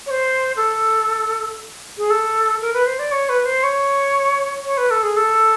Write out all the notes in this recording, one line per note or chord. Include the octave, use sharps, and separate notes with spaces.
C#5
C5
A4
G#4
A4
A#4
B4
C5
D5
C#5
B4
C5
C#5
C#5
B4
A4
G#4
A4